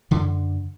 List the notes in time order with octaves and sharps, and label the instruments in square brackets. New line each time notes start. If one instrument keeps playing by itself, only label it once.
[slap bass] F#2 D3